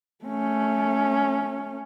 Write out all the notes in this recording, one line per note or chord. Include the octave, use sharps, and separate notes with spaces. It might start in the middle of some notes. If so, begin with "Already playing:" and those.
A3 C#4